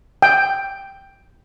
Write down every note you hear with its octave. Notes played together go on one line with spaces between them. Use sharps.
G5